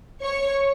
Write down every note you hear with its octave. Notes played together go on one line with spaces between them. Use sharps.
C#5 C#6